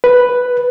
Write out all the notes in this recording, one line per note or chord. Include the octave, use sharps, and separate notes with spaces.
B4